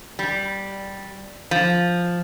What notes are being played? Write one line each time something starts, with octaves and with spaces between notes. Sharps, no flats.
G3
F3